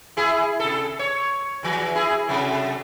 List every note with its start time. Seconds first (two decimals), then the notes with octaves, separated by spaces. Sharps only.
0.17 E4 G#4
0.60 C3 A4
0.99 C#5
1.63 E2 F3
1.95 E4 G#4
2.28 C3 F#3 A3